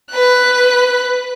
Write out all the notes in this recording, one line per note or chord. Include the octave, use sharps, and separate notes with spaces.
B4 F#6